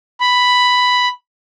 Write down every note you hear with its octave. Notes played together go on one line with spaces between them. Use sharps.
B5